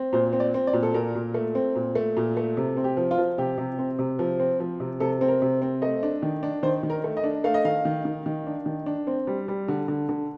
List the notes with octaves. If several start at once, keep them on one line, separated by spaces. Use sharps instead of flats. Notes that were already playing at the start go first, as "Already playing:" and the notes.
Already playing: C4
A#2 C5
C4
D5
C4
D5
A#2
A4
A#2 A#4
A#2
A3
C4
A#2
A3
A#2
A3
C3
C4
G4
F3
F4
F3
C3 G4
C3
C4
C3
F3
C4
F3
C3
C3 A4
C4
A#4
C3
C4
A3 D#5
D4
D#3
D4
D#3 C5
D#3
A#4
A3
D#5
D4
A3 F5
D#5
D#3 F5
D#3
D#3
D#3
D4
D#3
D4
C4
G3
G3
D3
D3
D3